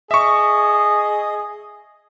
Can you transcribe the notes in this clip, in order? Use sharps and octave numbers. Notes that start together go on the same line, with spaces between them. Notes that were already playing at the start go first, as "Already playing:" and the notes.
G#4 D#5 E5 C#6